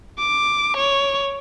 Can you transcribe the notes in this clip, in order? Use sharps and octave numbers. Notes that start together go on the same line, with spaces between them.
D6
C#5